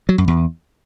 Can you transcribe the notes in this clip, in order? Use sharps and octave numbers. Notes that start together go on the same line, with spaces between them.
F#3
F#2
E2